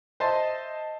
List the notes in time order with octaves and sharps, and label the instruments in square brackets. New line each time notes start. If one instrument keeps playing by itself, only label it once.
[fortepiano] C5 D#5 E5 A5 C6